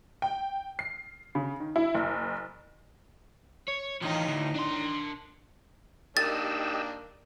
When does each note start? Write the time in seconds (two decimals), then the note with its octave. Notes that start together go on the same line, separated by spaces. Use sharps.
0.22 G5
0.79 C7
1.35 C#3
1.60 D#3
1.76 E4
1.94 F#1
3.68 C#5
4.02 A2 D#3 E3 D#4 F4
4.28 D2
4.56 D4 C6
6.17 D#3 A#3 D4 G4 D#5 E6 A6